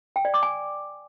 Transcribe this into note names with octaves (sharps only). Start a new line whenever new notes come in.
G5
D5
D6
G#5